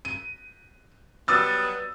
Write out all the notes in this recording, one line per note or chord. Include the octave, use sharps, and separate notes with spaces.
D#7
F#3 G3 B3 D#6 E6 A6